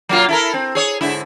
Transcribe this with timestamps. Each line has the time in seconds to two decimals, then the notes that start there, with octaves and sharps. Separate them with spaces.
0.09 F#3 A#3 F4
0.29 E4 A4 A#4
0.54 C4
0.75 G#4 C#5
1.01 G#2 D3 E4